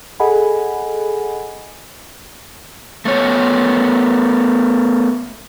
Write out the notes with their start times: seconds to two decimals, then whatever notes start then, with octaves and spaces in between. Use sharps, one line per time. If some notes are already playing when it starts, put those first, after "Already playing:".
0.20 G#4 A4 D#5 F#5 G#5 B5
3.05 A3 B3 C#5